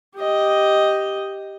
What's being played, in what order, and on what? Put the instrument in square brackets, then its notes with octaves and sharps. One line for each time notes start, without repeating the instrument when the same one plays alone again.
[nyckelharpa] G4 D#5